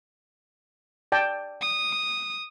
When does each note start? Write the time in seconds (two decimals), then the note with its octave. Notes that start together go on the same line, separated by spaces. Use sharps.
1.12 D5 G5 A5
1.61 D#6